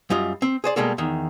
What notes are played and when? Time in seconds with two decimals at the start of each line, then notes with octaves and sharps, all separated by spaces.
0.10 F#2 G3 F4 D#5
0.42 C4
0.64 G#4 C5 D5
0.76 B2 G3 G#3 A#3 A4
0.98 E2 D#3